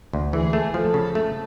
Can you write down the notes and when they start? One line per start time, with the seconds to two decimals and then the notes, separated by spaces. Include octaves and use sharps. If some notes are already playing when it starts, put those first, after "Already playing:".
0.13 D2
0.33 E3 G#4
0.53 A3
0.74 F3 A4
0.94 C#3
1.15 A3